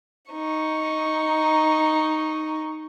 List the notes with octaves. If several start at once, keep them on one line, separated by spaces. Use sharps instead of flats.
D#4 C#6